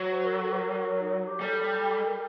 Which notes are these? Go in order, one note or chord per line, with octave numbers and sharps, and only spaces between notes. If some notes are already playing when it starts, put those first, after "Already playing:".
Already playing: F#3
C5
A#4
A4
C5
A#4
D#4
F#4
G4
G3 A4
A#4